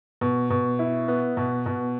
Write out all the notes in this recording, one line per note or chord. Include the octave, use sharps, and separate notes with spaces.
B2
B2
E4
B3
B2
B2